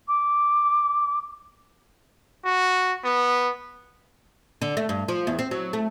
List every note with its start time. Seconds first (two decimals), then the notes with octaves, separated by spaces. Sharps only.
0.08 D6
2.45 F#4
3.04 B3
4.62 D3
4.77 A3
4.89 G2
5.08 F3
5.27 E2
5.39 C4
5.51 F#3
5.73 A3